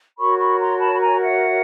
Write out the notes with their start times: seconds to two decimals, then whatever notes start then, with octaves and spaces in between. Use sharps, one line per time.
0.18 F#4 A#4 C#5 B5 C#6
0.38 B5 C#6
0.58 A#5 C6
0.78 A5 B5
0.94 B5
0.99 G#5 A#5
1.20 E5 F#5